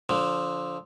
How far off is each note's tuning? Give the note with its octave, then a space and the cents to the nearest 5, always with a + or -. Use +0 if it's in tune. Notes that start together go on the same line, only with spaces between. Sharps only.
D3 -25 F3 +0